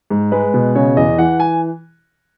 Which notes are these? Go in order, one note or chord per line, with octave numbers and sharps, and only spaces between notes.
G#2
G#3 B4
B2
C#3 C#5
E2 D#5
E3 F#5
G#5